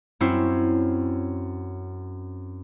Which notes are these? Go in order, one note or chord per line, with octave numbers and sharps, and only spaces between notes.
F#2 C4 C#4 E4 G6 C7